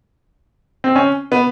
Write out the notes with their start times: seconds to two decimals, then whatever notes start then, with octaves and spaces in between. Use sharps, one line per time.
0.84 C4
0.96 C#4
1.32 B3